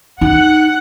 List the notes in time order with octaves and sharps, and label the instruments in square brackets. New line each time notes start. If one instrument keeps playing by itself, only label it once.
[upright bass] D#4 [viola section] F#5